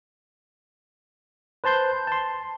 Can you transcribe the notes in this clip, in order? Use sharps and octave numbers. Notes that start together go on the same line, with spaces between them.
B4 C5 A5 C6 G6
A5 C6